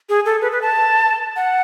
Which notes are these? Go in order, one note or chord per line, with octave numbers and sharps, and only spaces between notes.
G#4
A4
B4
B4
A5
F#5